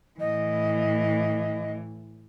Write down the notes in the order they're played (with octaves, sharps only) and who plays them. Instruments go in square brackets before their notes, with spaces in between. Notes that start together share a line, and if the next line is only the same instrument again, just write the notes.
[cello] A2 E3 [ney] D#5